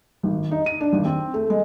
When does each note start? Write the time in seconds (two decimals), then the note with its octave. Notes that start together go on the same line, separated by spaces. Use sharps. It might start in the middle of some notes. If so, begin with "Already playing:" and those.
0.23 G#1
0.51 D#4
0.66 D#7
0.81 D4
0.93 G#1
1.05 C4
1.34 A3
1.50 G#3